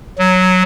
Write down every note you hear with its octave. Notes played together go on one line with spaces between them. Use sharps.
F#3